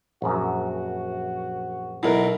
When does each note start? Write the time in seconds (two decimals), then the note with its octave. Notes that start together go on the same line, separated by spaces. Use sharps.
0.22 A#1 F#2 F#4
2.03 B1 B2 E4 A#4